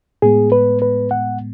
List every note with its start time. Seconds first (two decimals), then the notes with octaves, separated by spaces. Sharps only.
0.22 A2 G#3 B3 G#4
0.52 B4
0.82 B4
1.11 F#5